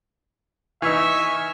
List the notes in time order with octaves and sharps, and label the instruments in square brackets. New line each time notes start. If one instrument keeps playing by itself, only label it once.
[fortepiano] E3 D#4 [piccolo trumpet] E5 [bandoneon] G#5 C#6 F6